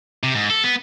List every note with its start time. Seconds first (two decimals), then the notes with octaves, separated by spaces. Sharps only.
0.23 C3
0.35 G#2
0.50 A4
0.64 B3